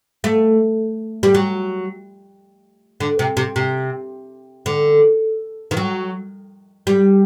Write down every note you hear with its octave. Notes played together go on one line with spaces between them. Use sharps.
A3
G3
F#3
D3
C3
C3
C3
D3
D#3
F#3
G3